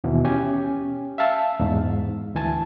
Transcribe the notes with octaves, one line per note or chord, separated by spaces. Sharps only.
D#2 B2 E3
C#4 G4 G#5
E5 F5 A5 E6
E2 G#2
D2 E3 G#5 A5